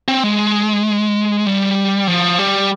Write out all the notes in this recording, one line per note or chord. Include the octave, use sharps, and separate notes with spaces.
C4
G#3
G3
F3
G3